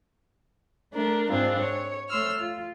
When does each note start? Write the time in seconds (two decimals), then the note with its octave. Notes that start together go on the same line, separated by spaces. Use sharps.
0.93 A3 D4 A#4
1.30 G#2 G#3 C4 D4 F4
1.61 C#5
2.09 A3 C#5 C6 E6 F6
2.39 F4